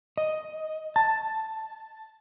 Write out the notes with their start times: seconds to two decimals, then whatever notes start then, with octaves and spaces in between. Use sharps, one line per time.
0.17 D#5
0.96 A5